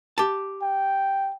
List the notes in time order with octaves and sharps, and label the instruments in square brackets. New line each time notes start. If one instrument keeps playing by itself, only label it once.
[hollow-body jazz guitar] G4 A5
[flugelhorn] G5